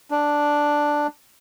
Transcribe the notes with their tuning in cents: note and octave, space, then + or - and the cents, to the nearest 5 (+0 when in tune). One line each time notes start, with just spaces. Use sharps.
D4 +0